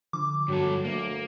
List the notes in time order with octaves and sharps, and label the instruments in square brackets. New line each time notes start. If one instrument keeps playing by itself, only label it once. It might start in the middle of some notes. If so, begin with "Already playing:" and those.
[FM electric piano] D3 F3 [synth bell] D6
[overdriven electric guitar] G2 A4 [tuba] F#3
[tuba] D2 [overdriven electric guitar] A#3